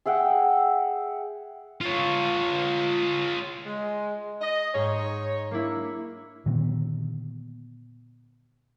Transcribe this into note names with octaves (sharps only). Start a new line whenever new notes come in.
G#4 E5 F#5 G5
F4 C#5
G#3
D#5
G#2 D#4 G#4 C#5
A#3 D4 E4
A#2 D3 D#3 B3